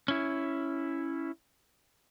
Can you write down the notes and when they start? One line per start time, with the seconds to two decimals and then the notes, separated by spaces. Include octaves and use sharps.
0.08 C#4 E4